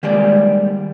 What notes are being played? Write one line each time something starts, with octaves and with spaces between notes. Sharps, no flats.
D#3 G3 G#3 A#3 G4 D5